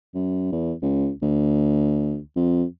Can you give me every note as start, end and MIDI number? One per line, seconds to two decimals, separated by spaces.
0.14 0.47 42
0.52 0.73 40
0.82 1.10 37
1.22 2.18 38
2.36 2.64 41